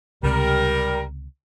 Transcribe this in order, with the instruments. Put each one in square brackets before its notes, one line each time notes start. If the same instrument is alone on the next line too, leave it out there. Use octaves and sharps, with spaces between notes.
[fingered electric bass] C#2 C3 [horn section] G3 A#4